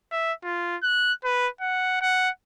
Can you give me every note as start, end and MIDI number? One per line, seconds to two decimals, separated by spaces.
0.12 0.33 76
0.44 0.76 65
0.83 1.13 90
1.24 1.47 71
1.61 1.97 78
2.01 2.29 78